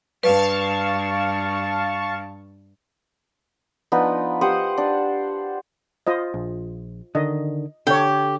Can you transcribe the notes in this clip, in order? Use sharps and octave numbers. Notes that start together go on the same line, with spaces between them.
G2 B4 F5 A5 C#6
F3 B3 D4 D#4
G4 C5 F#5 D#6
D4
F4 C5 D#5
A#1
D3 D#3 D#5
D3 G4 A4 C#5